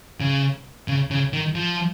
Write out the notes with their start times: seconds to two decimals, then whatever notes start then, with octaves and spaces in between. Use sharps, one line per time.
0.21 C#3
0.88 C#3
1.11 C#3
1.33 D#3
1.55 F3